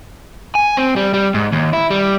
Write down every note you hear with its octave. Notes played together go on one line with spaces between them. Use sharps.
G#5
C4
G3
G3
G#2
D#2
E4
G3